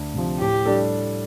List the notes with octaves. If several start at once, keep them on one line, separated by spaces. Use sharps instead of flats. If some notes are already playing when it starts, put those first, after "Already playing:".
Already playing: D2
C3 F3
A2 G4
G3 D4 A4